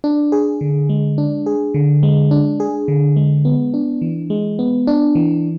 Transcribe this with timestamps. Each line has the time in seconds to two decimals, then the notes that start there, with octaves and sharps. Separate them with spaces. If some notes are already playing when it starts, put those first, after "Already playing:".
0.04 D4
0.32 G#4
0.61 D3
0.89 G#3
1.18 D4
1.46 G#4
1.74 D3
2.03 G#3
2.31 D4
2.60 G#4
2.88 D3
3.16 G#3
3.45 B3
3.74 D4
4.02 E3
4.30 G#3
4.59 B3
4.87 D4
5.15 E3